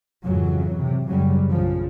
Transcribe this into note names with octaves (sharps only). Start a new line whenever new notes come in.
F2 G#2 C#3 E3 F#3
C3
F#2 C#3 F#3 G3
A#1 A#2 C#3 F3